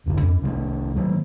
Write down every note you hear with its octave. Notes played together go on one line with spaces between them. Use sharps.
F1 C#2 A2 D3
F2 C#4
C2 C3 G3 A3
D#3 F#3 G#3 A#3